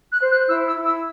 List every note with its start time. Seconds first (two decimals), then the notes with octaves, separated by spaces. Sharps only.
0.12 F#6
0.21 C5
0.31 F#6
0.49 E4 E6
0.67 E6
0.76 E4
0.86 E6